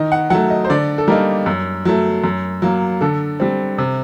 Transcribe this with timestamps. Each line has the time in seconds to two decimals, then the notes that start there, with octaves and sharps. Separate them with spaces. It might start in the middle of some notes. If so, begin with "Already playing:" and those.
Already playing: D#3 D#5
0.12 F#5
0.30 F#3 A3 F#5
0.50 D#5
0.65 C5
0.70 D3 D5
0.98 A4
1.08 G3 A#3 D#4 A#4
1.46 F#2
1.85 F#3 A3
2.24 F#2
2.62 F#3 A#3
3.01 D3 A4
3.40 G3 C4
3.78 C3